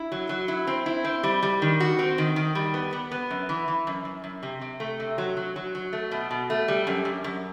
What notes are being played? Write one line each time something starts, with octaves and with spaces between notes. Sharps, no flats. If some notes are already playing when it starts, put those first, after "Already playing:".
Already playing: E4
F#3
F#3
E4
C4
E4
C4
G3
G3
D#3
F#4
C4
D#3
D#3
G3
B3
B3
B3
F#2
E3
E3
F#2
F#2
F#2
C3
C3
A3
C3
F#3
F#3
F#3
F#3
A3
B2
B2
A3
G3
F#2
F#2
F#2